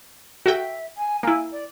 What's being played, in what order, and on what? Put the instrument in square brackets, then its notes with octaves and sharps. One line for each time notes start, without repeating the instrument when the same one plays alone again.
[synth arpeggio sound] F#4 A4 G5 [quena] E5
[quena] G#5
[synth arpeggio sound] A#3 E4 [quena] G#5
[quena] D5